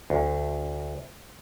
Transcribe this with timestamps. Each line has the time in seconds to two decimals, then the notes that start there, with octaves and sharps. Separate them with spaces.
0.10 D2